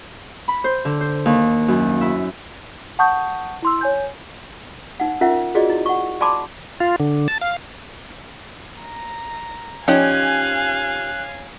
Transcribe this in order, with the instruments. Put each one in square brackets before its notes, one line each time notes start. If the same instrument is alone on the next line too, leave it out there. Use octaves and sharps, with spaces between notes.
[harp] B5
C5
D3
C5
D#2
F#2
E4
[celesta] F#5 A5 C#6 D#6 G6
E4 C6 E6
C#5 G#5 G6
[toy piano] D#4 F#5
C#4 F4 A#4 E5 F#5
F4 F#4 G#4 D5 D#5
E4
F#5 C#6
D5 G#5 A5 B5 C6 D6
[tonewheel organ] F4
D3
A5
F5
[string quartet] A#5
[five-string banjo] F3 D#4 G4 [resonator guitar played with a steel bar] C#4 [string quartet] F5 G#5 [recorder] F#6